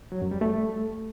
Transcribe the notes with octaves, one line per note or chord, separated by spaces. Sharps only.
F#3
F#2
G3
A3